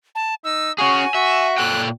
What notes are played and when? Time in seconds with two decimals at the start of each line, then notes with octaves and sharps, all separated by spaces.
0.15 A5
0.44 D#4 E6
0.78 C#4 F#4 G#4 G#5
1.15 F#4 E5
1.58 A#2 A4 G5 F#6